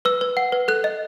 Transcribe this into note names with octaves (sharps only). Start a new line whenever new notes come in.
B4 E6
B4
F#5
B4
A4 F#6
D#5